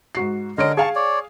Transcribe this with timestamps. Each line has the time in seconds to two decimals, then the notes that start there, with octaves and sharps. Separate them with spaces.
0.15 G#2 F#4 C7
0.58 D3 G#3 A#4 C#5 D#5 D7
0.77 G#4 F5 G#5 A5 C#6
0.95 C#5 D5